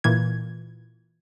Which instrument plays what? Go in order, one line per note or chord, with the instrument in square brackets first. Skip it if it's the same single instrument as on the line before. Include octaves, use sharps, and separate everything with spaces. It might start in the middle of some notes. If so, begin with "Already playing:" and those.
[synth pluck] A#2 E3 G#6